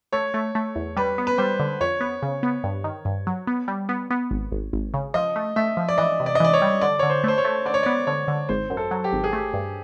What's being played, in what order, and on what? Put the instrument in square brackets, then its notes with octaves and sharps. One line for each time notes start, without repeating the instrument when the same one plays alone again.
[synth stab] A3 [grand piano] C#5
[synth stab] A3
A3
E2
[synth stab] G3 [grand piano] B4
[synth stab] B3
[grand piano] B4
[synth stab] G3 [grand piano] C5
[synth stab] D3
[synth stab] F2 [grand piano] C#5
[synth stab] B3
C#3
B3
G2
D#3
G2
F#3
B3
G3
B3
B3
G#1
G#1
G#1
C#3
[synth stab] F3 [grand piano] D#5
[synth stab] A3
[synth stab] A3 [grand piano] E5
[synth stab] F3
[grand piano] D5
[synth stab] E3 [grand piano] D#5
[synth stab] C3
[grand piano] D5
D#5
[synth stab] E3 [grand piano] D5
[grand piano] C#5
[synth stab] G3
[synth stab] D3 [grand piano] D5
[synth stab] D3 [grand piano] C#5
[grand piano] C5
[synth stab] A3 [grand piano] C5
[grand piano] C#5
[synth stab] A3
[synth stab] D3 [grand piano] D5
[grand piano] C#5
[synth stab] B3 [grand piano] D5
[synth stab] D3 [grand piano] C#5
[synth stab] D3
[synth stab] G#1 [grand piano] C5
[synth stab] F#2
[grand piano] A4
[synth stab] F#3
[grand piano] G4
[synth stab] G#1
[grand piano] G#4
[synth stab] A3 [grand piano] G4
[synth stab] G2